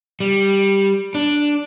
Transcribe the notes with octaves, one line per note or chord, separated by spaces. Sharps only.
G3
D4